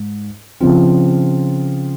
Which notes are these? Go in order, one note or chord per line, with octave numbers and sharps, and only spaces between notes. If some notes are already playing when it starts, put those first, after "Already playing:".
Already playing: G#2
C#3 F3 C4 F4